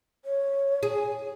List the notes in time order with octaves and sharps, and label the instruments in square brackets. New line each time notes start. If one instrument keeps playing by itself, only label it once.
[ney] C#5
[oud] G#4